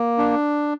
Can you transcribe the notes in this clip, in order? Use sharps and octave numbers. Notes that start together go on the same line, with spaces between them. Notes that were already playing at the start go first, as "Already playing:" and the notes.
Already playing: A#3
D4